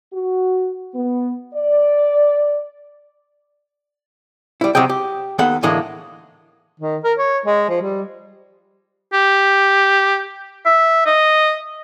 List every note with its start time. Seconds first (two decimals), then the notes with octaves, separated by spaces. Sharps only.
0.13 F#4
0.94 B3
1.54 D5
4.61 G3 E4
4.75 C3 F#3 D#5 G5
4.89 G4
5.39 D#2 B3 A4 F#5
5.63 A2 D3 E3 G#3 A#3
6.80 D#3
7.04 A#4
7.18 C#5
7.46 G#3
7.69 F3
7.82 G3
9.13 G4
10.66 E5
11.06 D#5